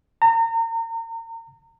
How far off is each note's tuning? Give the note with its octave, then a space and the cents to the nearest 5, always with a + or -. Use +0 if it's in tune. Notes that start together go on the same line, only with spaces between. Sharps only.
A#5 -35